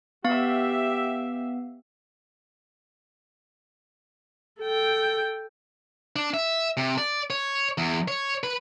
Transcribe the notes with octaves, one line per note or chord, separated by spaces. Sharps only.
B3 G4 E5 F5
A4 G5
D4
E5
C3
D5
C#5
E2
C#5
B4